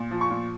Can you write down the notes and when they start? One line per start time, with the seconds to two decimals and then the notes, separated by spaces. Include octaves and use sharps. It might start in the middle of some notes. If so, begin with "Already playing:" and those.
Already playing: A#2
0.11 F3
0.21 C#6
0.31 A#2